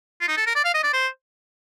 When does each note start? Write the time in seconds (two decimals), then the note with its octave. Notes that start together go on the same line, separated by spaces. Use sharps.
0.21 F4
0.28 D#4
0.37 A4
0.47 A#4
0.55 D5
0.65 F5
0.74 D#5
0.83 D5
0.93 C5